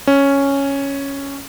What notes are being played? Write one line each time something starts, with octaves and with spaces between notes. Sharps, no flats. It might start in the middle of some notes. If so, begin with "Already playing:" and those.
C#4